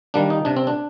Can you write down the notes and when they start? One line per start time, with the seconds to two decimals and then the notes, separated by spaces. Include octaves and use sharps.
0.14 D#3 G3 A#3 D4
0.30 D#4
0.45 C3 D4
0.57 C4
0.67 D4